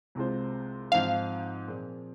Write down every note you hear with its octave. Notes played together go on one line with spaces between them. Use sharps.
C2 C3 G#3 F4 C5
G#2 F3 C4 D#4 C5 F5
A#2 F3 C4 G#4